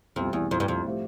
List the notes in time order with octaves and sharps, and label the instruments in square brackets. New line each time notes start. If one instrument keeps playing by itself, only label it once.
[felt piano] C2 B2 G3 C4 [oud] F2
[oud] E2
F2
G2
F2
[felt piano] A2 F3 A3 C4 G4